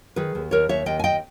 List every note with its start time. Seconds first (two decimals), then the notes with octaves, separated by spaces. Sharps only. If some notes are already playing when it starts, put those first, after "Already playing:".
0.16 D#3 G#4 B4
0.35 D#2
0.51 D#2 A#4 C#5
0.69 D#2 C#5 E5
0.86 D#2 D#5 G5
0.99 G#5
1.04 D#2 D#5 G5